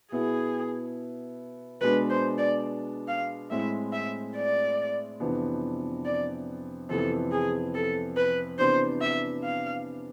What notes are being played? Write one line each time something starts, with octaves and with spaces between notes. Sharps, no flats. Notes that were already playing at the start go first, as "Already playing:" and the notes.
B2 B3 E4 G#4
B2 G#3 B3 D4 B4
C5
D5
F5
A2 G#3 C4 E4 E5
E5
D5
F2 C3 E3 B3 D4
D5
F2 C3 E3 B3 A4
G#4
A4
B4
C3 E3 B3 D4 C5
E5
F5